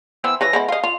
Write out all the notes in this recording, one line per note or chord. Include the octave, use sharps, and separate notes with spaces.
E3 B3 C4 E6
E3 B4 C#5 A#6
G#3 B3 E4
F4 D#5 F5
F4 F7